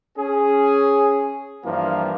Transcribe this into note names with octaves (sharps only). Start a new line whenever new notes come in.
C#4 G#4
G2 E3 F3 A#3